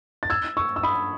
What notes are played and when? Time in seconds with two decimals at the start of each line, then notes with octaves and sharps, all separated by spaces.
0.23 A6
0.30 E6 G#6
0.57 C#6 E6
0.76 E6
0.83 B5 D#6